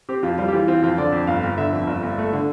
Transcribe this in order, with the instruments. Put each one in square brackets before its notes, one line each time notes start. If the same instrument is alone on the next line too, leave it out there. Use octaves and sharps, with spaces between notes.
[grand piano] C4 G4
F2 F4
G3 F4
G4
E3 F4
C4 F4
F2 F4
D3 D5
F2
G1 F5
G1
D3 E5
F2
G1
G1
A3
D3